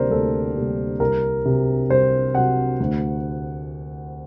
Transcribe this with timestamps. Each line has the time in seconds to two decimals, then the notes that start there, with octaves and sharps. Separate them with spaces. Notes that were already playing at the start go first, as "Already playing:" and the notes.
Already playing: D2 C3 G3 A#3 A#4 C5 D5
0.10 D2 A4
0.56 C3 G3 A#3
1.00 C2 A#4
1.45 C3 F#3
1.89 C2 C5
2.35 C3 F#3 F#5
2.80 D2